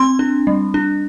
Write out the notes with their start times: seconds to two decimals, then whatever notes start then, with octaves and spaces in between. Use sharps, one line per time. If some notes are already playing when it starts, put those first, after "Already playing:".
Already playing: C4 C6
0.19 D4
0.47 G3
0.74 D4